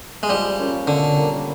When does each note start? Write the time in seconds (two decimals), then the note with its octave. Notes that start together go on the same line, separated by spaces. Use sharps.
0.23 G#3
0.29 F3 G3
0.59 A#3 C#4 F4
0.87 B2 D3
1.16 G3 A#3